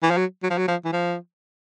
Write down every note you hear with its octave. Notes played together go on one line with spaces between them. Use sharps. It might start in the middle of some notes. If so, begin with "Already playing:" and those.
E3
F3
F#3
F#3
F3
F#3
F3
E3
F3